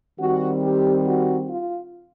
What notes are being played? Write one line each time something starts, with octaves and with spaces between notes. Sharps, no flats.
D#3 G3 C4 F#4
G4
F#4
F4